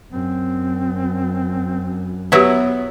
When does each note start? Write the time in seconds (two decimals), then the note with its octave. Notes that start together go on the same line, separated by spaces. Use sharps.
0.12 F#2 C4
2.32 F#3 B3 E4 G4 B4